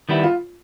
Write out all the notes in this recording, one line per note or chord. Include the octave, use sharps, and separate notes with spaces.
D#3 G3 B3 E4
F4